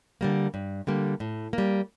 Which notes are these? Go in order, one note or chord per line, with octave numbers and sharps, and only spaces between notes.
D3 G3 A#3
G2
D3 G3 A#3
A2
G3 A#3